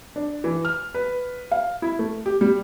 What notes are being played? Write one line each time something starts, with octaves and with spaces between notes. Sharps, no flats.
D4
E3
F6
B4
F5
E4
A3
G4
G3